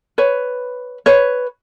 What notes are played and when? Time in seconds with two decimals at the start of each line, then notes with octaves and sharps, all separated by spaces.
0.18 B4 C#5
1.06 B4 C#5